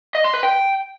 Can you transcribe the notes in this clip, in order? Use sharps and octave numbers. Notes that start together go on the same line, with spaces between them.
D#5
C6
B4
G5